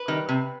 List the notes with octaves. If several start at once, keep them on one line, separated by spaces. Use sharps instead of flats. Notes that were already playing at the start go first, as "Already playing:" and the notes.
Already playing: B4
D#3 G3
C3